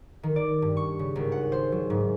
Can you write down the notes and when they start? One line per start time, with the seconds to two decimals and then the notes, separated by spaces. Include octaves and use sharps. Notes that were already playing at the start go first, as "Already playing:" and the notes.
0.23 D#3
0.36 D5
0.62 G2
0.77 C#6
0.99 C#3
1.15 G#1
1.32 F#5
1.52 C5
1.72 F#3
1.90 G#2